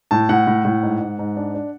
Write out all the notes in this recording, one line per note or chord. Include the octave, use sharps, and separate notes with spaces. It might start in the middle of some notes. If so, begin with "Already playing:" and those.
A2 A5
A2 F#5
A2
A2
G#2
G#2
G#2
D4
D4